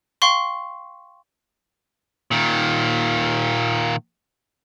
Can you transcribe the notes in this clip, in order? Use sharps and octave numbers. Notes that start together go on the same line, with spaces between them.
F5 G5 C6 C#6
A#2 D#3